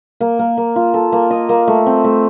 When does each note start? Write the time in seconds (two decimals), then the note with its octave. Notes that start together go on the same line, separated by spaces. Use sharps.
0.21 A#3
0.39 A#3
0.57 A#3
0.76 F4
0.94 A4
1.12 A#3
1.30 D#5
1.49 A#3
1.68 A3
1.86 C4
2.04 A3